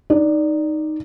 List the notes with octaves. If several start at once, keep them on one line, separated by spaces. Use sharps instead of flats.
D#4 D5